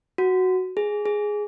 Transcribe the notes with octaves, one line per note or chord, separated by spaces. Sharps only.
F#4
G#4
G#4